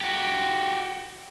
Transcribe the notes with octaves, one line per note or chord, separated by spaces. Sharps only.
F#4 G4